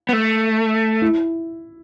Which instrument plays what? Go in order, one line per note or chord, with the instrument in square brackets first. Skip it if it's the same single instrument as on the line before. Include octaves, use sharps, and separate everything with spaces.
[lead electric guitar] B3
A3
[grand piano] E4